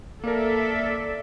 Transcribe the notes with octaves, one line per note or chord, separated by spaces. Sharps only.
A#3 A4 A#4 D5 E5